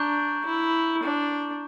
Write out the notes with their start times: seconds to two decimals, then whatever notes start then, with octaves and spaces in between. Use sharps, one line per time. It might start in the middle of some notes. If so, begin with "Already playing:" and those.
Already playing: D4 A#5 C#6 G6
0.45 E4
1.02 D4